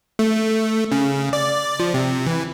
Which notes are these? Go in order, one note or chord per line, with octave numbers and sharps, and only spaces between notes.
A3
C#3
D5
F3
C3
E3